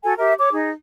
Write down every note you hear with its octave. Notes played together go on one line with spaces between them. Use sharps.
F#4 A4 G#5
G4 A#4 E5
C#5 D6
D#4 G#4